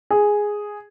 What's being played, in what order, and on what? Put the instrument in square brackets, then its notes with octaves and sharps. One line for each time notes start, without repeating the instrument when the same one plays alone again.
[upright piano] G#4